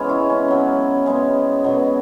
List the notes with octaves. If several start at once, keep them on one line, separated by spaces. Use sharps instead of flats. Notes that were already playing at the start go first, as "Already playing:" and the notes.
Already playing: C#3 E3 G#3 B3 C#4
E4
C#4
C#3 F#3 B3
C#3 G#3 B3
B2 F#3 B3